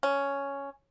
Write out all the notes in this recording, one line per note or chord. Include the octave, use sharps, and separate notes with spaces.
C#4